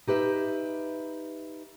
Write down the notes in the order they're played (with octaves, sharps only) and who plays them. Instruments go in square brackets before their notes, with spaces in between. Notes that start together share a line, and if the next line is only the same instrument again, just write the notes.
[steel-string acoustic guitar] D#4 G4 B4 E5